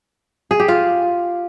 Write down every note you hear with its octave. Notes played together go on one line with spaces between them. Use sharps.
G#4
G4
F4